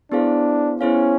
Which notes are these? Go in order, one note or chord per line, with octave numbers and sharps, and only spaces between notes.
B3 D4 E4 G#4 C5 F5
B3 C#4 E4 G#4 C5 F5